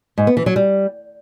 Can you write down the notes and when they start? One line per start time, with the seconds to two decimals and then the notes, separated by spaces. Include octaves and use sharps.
0.18 G#2
0.27 B3
0.37 E3
0.46 F#3
0.56 G3